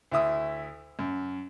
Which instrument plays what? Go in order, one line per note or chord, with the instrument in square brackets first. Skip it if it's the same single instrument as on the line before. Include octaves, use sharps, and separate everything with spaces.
[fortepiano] D2 E4 E5 D#6
F#2